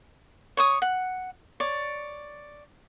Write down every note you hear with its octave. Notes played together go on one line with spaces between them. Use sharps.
C#5 C#6 D#6
F#5
C#5 D5 D6